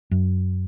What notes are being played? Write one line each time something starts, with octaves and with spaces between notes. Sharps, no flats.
F#2